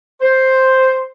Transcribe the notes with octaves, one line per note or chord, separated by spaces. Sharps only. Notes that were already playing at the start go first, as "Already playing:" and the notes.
C5